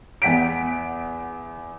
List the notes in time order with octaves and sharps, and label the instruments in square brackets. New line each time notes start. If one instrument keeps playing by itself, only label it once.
[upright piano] E2 F#5 B6 D7